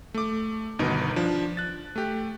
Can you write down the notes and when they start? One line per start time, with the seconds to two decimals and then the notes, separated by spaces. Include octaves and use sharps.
0.14 A3 D6
0.79 G1 B2 D#3 D#4 A#4 B4
1.16 F3 D4
1.57 F#6 A6
1.96 A3 G4